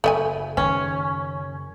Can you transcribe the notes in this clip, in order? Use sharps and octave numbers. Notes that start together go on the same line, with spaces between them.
F#1 A3 D#5 G#5
D#3 C#4